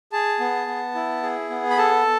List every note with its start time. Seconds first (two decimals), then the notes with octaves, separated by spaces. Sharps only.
0.12 G#4 A5
0.40 B3
0.67 B3
0.95 E4
1.23 G#4
1.50 B3
1.70 B5
1.78 A4 A5